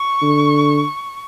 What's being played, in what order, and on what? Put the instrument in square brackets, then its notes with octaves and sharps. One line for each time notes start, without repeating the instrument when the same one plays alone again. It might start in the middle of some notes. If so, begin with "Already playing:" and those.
Already playing: [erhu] C#6
[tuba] D3